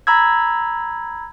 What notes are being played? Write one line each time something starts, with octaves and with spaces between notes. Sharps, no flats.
A#5 B5 E6 G#6